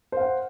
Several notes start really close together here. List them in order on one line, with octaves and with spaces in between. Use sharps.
C5 F5 F#5